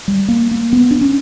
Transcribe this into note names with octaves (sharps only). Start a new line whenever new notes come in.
G3
A#3
A#3
B3
D4
C#4